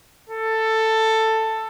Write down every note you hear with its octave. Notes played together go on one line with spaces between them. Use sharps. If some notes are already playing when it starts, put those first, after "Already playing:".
A4